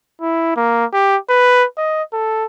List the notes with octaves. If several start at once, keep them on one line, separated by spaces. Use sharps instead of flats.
E4
A#3
G4
B4
D#5
A4